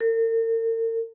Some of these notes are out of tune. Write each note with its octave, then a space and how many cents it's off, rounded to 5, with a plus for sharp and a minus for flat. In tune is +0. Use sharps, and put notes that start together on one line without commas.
A#4 -45